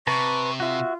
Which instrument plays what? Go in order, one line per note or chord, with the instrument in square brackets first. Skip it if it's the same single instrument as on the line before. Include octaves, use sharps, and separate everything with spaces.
[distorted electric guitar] C3 [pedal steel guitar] B4 A5 A#5 [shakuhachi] C#6
[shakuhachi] F4 [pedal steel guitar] F#4 E5